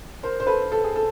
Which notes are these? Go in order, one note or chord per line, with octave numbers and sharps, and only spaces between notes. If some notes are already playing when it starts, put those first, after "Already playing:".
A#4 C5
C5
A4 B4
A4
G#4
A4